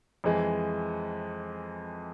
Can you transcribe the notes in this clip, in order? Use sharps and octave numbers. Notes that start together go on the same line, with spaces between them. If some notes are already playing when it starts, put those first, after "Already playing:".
F2 E3 G#3